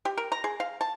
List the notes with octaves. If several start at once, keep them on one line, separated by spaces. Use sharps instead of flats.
G4
A#4
A#5
G#4
F5
A5